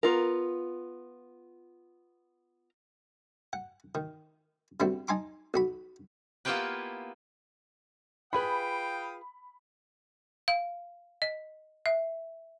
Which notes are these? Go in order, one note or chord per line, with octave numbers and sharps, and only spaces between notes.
B3 F4 A#4
F#5
D#3
D3 G3 B3 C4 E4 F#4
D#4 G#5 A5 C6 D6
B1 F#4 B5
A#3 B3 E4 F4 G4 B4
F4 G#4 B4 F5 G5 B5 D#6
F5
D#5
E5